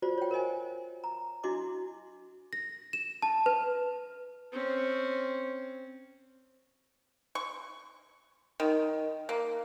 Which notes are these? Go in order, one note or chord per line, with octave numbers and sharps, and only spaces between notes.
F4 F#4 C5 D5
C#5 G5
A#4 C5 D#5 G#5
A#5
D4 E4 F#4 D#5 C6 D6
A#6
E7
A5
B4
C4 C#4
C#6
D#3
A#3